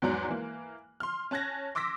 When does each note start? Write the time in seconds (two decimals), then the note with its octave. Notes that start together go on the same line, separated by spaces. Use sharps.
0.02 E2 G#2 F#3 D5 A#5 F#6
0.29 E3 A#3
1.00 C6 F6
1.31 C#4 A5 F#6 G#6 A#6
1.75 C6 D6 E6 A#6 B6